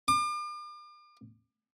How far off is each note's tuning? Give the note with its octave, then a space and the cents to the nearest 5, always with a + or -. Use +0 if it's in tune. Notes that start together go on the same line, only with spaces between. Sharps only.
D6 +40